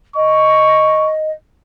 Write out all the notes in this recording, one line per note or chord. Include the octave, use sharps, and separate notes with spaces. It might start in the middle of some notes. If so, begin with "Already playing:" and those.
D#5 C#6